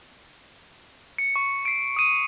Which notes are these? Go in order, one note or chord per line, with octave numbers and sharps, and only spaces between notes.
C#7
C#6
C7 D7
D#6 D#7